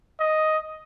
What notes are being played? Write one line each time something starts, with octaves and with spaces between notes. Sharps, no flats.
D#5